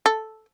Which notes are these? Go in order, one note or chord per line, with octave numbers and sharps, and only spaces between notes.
A4